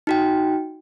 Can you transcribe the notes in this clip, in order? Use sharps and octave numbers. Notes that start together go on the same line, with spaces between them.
D#4 F#4 G5